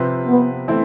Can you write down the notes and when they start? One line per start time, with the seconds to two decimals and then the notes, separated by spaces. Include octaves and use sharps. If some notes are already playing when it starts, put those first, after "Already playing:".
Already playing: C3 F3 C4 F4 B4
0.27 B3
0.68 E3 A3 C4 E4